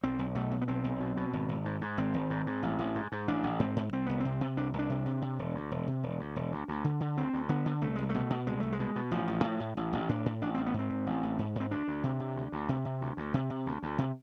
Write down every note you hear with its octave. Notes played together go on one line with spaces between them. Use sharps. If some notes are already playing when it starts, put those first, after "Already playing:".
B1 C4
B1
B2 A3
B2
B3
B1 C4
B1
B2
B2
G#1
G#1
G#2
G#2
G#1 C4
G#1
G#2
G#2
A1
A1
G#2
G#2
A1 D4
A1
G#2 C4
G#2
C2 C4
C2 B3
C3 C4
C3
C2 D4
C2
D4
C3
C3
C3
E1
D2
E1
C3
E1
D2
E1
D2
D2
D3
D3
D2 C4
D2
D3 B3
D3
C2 A3
C2 G#3
A3
B2
B2
C2 G#3
C2 A3
G#3
B2
B2
A1 F3
A1
A2
A2
A1
A1
A2 D4
A2
A1 D4
A1 C4
B3
G#2 C4
G#2
A1
A1
G#2
G#2 C4
D2 D4
D2
C3
C3
D2
D2
C3
C3
D2
D2
C3
C3
D2
D2
C3